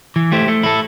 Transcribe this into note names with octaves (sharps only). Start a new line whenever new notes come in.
E3
A3 E4 G4 C5
A3
E4 A4